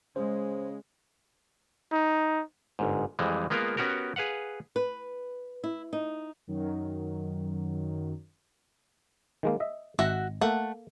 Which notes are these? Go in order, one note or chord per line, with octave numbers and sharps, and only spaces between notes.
C#3 G#3 C5
D#4
G1 G#2
F2 E3 G3 G#3
G#3 A#3 B3 F4 A#4
B3 C#4 F#4 G4 A#4
G#4 B4 F5 F#5
B4
E4
D#4
F#2 D#3 F#3
D#3 G#3 A#3
D#5 E5
G#1 F#4 E5 F#5
A3 A#3 A4 F#5